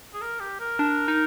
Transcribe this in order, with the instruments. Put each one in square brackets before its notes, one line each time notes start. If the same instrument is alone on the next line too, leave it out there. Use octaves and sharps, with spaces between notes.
[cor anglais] G#4
A#4
G4
A#4
[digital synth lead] D4
D#4